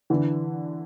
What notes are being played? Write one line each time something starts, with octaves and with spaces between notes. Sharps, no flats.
D3 E3